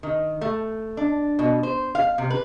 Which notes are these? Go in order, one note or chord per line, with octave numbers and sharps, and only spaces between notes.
D#3
A3
D4
B2
C5
F5
C3
B4